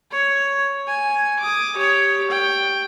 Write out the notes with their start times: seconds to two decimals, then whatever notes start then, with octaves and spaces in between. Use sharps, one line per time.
0.11 C#5
0.87 G#5
1.39 D6 D#6
1.76 G4 C#5
2.30 G5